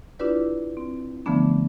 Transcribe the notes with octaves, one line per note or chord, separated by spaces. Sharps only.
D4 E4 F4 G4 B4 D5
C4
D3 E3 F3 A3 B3 D4